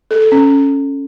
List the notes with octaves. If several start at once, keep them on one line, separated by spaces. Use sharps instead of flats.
A4
A4
C#4